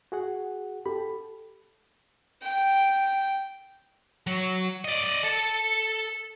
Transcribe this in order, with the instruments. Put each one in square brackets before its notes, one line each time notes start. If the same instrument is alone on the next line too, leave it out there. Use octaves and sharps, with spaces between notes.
[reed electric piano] F#4 G#4 F#5
[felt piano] G4 [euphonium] A4 [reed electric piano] B5
[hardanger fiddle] G5
[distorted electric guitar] F#3
D5 D#5
A4 A5